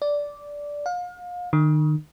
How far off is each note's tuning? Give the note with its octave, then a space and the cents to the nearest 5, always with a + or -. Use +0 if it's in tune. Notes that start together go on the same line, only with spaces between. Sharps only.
D5 -10
F5 +35
D#3 -35